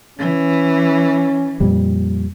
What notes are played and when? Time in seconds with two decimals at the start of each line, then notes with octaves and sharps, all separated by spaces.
0.19 E3 C#4
1.60 F2 A#2 G3